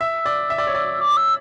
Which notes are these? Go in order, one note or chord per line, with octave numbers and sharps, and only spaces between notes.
E5 E6
D5
E5
D5
C#5
D5
D6
E6